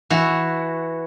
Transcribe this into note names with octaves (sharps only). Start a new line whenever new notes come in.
E3 F#4